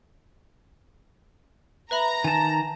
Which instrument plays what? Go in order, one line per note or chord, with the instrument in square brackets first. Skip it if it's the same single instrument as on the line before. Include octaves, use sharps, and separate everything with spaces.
[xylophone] B4 E5 B5 [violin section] A#5
[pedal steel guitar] D#3 A5 [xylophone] G#5